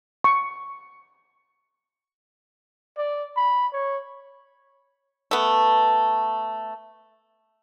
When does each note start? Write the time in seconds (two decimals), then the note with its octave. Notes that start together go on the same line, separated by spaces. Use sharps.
0.24 C#6
2.97 D5
3.36 B5
3.73 C#5
5.31 A3 B3